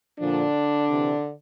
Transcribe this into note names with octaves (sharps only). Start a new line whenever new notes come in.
A#2 D3 F3 D4
C3 E3